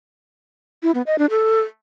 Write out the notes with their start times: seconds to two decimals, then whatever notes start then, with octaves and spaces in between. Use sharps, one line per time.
0.83 E4
0.95 B3
1.07 D#5
1.18 D4
1.30 A4